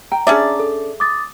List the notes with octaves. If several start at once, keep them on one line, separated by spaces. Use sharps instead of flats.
G5 A#5
C#4 D4 G#4 D5 E5
A4
D6 D#6 A6